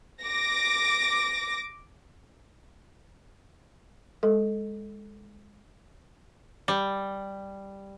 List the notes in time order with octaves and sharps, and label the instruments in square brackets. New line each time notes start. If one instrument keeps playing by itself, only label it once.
[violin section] D6 A#6
[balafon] G#3 A4
[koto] G3